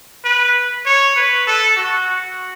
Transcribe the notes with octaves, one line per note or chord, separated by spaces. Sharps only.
B4
C#5
B4
A4
F#4